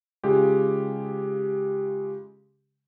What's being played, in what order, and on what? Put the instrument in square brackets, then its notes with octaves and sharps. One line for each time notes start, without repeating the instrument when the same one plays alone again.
[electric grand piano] C#3 G#3 F4 G4 G#4